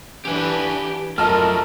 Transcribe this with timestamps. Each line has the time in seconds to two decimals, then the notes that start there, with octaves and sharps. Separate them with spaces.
0.25 E3 D4 G4 B4 F#5 G#5
1.18 F#2 F3 A3 A#4 D#5 A5 A#5 F6